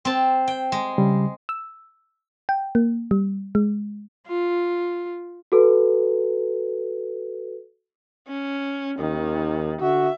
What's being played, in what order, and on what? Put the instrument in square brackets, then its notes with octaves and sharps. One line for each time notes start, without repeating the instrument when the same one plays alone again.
[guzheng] C4 A5
G5
G#3
[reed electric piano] C#3 G3
[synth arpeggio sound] E6
G5
A#3
G3
G#3
[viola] F4
[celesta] F#4 A4 B4
[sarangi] C#4
[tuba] D#2 [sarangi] D#3
[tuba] D3 [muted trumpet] F#4 [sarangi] E5